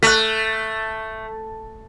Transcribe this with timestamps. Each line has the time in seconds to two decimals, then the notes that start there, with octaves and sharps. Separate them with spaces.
0.03 A3 F#6 B6